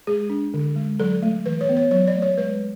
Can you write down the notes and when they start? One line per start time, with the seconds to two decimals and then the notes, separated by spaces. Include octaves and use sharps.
0.07 G#3 G#4
0.30 D4
0.54 D3
0.76 G#3
1.00 F#3 A4
1.23 A3
1.46 E3 B4
1.61 C#5
1.69 B3
1.77 C#5
1.91 F#3 C#5
2.07 D5
2.15 A3
2.22 C#5
2.38 G#3 B4